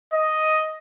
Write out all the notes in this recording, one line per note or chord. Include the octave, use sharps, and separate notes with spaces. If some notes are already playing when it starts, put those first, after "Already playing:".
D#5